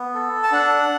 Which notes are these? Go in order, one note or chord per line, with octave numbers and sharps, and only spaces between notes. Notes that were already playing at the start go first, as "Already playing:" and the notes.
Already playing: B3
A4
A5
D4 F#5